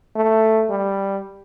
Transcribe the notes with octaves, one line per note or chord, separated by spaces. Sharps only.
A3
G3